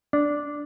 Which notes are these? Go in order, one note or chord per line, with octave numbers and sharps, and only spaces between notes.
D4